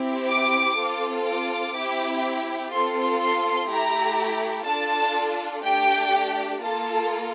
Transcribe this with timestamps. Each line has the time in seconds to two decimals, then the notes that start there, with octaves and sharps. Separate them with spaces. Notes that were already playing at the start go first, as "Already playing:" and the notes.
Already playing: C4 E4 G4
0.28 D6
0.77 C4 F4 A4
1.26 D6
1.75 C4 E4 G4
2.72 C4 F4 A4 C6
3.21 C6
3.70 A3 E4 G4 A#5
4.67 D4 F4 A4 A5
5.64 A3 D4 G4 G5
6.62 A#3 F4 A4 A5